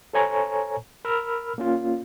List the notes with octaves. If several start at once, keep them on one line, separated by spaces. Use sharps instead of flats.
A4 C5 C#5 G#5 A#5 C#6
A#4 B5 E6 F6
A#3 C#4 F4